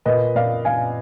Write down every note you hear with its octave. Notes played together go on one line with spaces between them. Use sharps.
A#2 B4 D#5
A#2 D5 F5
A#2 F5 G#5